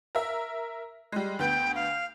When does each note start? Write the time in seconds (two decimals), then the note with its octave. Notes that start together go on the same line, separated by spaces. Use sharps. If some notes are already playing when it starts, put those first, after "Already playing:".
0.15 A#4 E5
1.12 G3 G#3
1.39 D2 B3 G5 G6
1.75 F5